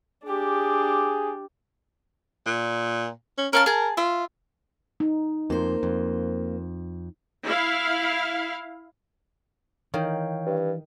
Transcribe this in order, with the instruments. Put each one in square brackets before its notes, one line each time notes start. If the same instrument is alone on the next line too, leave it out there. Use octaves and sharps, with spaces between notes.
[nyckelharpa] D4 G4 [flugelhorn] G#4
[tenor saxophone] A#2
C#4
[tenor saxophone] C#4 [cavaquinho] A#4 F5 A5
[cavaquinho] G#4 A5 [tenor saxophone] A#4
[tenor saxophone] F4 [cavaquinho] E5
[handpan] D#4
[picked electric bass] F2 [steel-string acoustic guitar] A#3 C5
[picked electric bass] F2
[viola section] E4 F5
[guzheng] D#3 [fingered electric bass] E3 [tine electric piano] C#5 F5 G5
[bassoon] G2